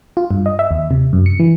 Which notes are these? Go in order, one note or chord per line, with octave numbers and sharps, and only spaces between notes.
F4
G2
D#5
E5
D#2
C3
F#2
C#7
E3